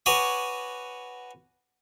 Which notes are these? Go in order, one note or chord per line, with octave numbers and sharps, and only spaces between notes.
F#4 B4 C#5 G#5 D6 D#6